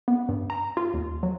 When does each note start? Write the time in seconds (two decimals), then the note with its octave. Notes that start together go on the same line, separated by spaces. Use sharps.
0.08 B3
0.29 G2
0.50 A#5
0.77 F4
0.94 D#2
1.23 F#3